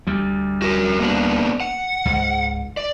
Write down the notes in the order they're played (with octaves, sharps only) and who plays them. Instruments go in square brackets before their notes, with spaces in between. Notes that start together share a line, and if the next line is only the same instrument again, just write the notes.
[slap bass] D2 G3
[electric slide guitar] F#4 A#4
A#3 B3 D4
F#5
[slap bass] C#2 G#2
[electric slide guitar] D5